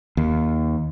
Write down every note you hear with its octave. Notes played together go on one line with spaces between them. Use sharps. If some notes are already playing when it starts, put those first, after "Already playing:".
D#2